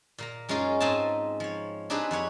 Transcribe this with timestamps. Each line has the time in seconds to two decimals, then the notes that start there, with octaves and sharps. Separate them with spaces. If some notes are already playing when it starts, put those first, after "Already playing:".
0.18 A#2 A#3 A#5
0.49 F#2 G#3 C#4 D#4 F4 A#4
0.80 G#2 C4 D#4 G#5 A5
1.40 F3 C#5
1.90 C4 D4 D#4 G4 G#4 B4
2.11 F2 G3 C#5 F#5